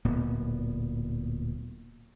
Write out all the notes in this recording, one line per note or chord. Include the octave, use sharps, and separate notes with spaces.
D1 A#2 B3